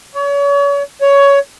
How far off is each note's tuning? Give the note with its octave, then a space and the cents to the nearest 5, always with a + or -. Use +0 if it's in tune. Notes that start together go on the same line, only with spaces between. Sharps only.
C#5 +35
C#5 +15